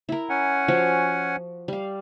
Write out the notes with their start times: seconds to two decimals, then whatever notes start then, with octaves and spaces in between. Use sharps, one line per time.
0.09 E4 A#4
0.30 C#4 F#5 G#5
0.68 F3 F#4 F5
1.68 G3 F5